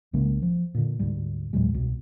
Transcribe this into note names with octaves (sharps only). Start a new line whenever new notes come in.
C2 C#3 G#3 A#3
F3
A#2 D3
D2 G#2 G3
D#2 A#2 F#3 G#3
C2 B2